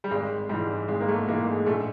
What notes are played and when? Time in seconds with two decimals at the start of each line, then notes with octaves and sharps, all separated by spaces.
0.04 G3
0.11 G#1 G#3
0.49 G#2 E3 G3
0.88 G#1 G#3
1.01 A#3
1.08 A3
1.28 G#2 E3 A#3
1.47 G#3
1.66 A#1 A3